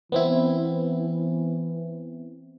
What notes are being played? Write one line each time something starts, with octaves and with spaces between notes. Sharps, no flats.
E3 B3 C4 E4